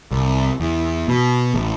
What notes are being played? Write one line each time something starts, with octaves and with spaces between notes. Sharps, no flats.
C2
E2
B2
A1